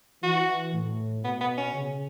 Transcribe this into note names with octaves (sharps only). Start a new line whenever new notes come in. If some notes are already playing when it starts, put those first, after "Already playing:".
E3 F#4
A2
B2 B3
B3
C#4
C#3